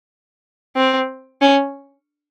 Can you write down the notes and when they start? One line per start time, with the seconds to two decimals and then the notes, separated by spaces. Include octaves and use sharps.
0.76 C4
1.41 C#4